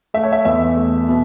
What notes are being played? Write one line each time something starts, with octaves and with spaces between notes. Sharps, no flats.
A3 E5
C#5
E5
E2 E5
A3
B2